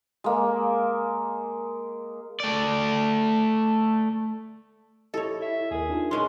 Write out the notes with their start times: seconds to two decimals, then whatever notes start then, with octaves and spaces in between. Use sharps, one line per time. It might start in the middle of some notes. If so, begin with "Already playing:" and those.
0.24 G#3 A#3
2.40 A3 D5
5.14 E4 G4 A4 C#5 D#5
5.42 E5
5.71 D#2 G#4 A#4
5.89 D4 D#4 F4
6.11 B2 G#3 C#4 C6